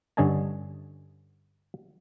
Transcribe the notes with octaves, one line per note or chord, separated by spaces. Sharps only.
G2 D3 C#4 D#5 G#5 A5